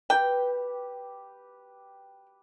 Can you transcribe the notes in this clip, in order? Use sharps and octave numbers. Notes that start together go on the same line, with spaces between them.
G4 B4 G5